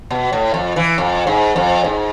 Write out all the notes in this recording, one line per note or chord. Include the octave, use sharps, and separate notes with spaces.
B2
A2
F2
E3
F2
G#2
F2
G#2